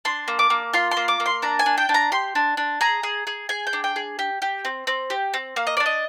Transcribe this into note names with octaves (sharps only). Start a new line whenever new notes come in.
D4 C6
A#3
D6
A#3
F4 C6
C6
A#3
D6
A#3
C6
D4 A#5
G#5
D4
G5
D4
A#5
G4 C6
D4
D4
G#4 A#5
G#4
G#4
G#4 G#5
G5
D4
G5
G#4
G4
G4
C4
C4
G4
C4
A#3 F5
D#5
D4 D5
D#5